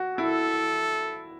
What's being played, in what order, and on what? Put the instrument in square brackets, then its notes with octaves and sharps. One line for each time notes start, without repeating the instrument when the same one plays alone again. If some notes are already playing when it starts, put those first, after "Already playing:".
Already playing: [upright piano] F#4
[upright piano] E4 [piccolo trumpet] A4